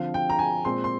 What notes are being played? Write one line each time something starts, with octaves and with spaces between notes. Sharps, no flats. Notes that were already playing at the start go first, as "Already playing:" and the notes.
Already playing: D3 F3 C4 F5
G5
A#5
G#5
A#2 G#3 C4 C6
C6